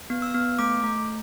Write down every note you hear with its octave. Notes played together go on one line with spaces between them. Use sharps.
B3
E6
B3
A3 D6
A3